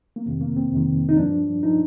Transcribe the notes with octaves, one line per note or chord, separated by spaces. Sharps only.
A#3
F2 C3 D#3 C4
A#3
C4
F2 C3 D#3
D#4
G2 F3 D4
F3 D#4